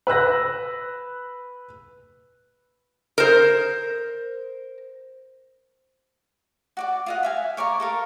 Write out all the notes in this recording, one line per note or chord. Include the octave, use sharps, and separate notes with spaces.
B4 E6 F#6 A#6
A#4 C5
F#4 D5 D6
F4 D#5 F#5
E5 F5 G#5
C#5 D5 A#5 C#6
A4 A#4 F5